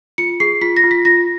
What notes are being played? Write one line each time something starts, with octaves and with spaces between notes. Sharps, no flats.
F4 C#7
G#4 C7
F4 B6
A#6
F4
B6
F4 A#6